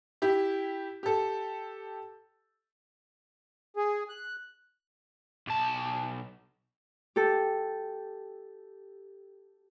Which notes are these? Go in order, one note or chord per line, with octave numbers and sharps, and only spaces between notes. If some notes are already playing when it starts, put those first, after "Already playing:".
E4 G4
G4 A4
G#4
F#6
B1 A5
G4 A4